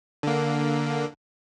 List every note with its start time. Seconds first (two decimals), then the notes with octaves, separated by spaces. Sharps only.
0.23 D3 A#3